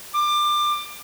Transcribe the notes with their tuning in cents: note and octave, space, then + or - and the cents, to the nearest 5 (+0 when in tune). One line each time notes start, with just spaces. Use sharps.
D6 +25